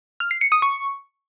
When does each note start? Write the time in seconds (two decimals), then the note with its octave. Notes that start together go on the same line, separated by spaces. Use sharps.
0.20 F6
0.31 C7
0.41 C#7
0.52 D#6
0.62 C#6